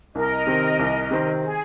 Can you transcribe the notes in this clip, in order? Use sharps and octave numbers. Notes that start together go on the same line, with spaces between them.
C2 A#4 D#5
C3 D#3 C4
C2
C3 D#3 C4
G#4